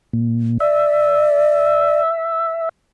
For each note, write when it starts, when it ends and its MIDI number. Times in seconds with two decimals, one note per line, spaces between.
0.13 0.58 46
0.60 2.01 74
0.60 2.69 76